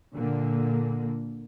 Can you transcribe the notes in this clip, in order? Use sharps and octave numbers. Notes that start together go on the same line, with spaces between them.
A#2 D3 A#3